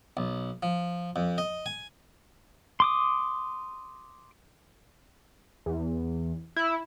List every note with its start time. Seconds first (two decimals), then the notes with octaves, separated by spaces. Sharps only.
0.17 B1
0.63 F3
1.16 F2
1.38 D#5
1.66 G#5
2.80 C6 D6 D#6
5.66 E2
6.56 E4